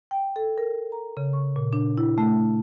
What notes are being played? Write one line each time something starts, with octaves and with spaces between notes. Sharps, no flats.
G5
A4
A#4
A#5
C#3
C#6
A#2
D4
E4
A3